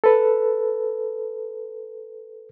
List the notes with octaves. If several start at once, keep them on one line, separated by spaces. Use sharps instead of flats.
A4 B4